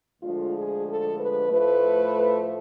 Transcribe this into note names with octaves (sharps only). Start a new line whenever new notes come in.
D2 D3 F3 G#3 F4
G#4
A4
B4
A2 F3 A3 B4